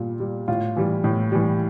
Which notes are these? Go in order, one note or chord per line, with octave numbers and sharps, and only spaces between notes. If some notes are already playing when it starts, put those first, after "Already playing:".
Already playing: A#2 G3
G3
A2 F4
E3 G3
A2
E3 G3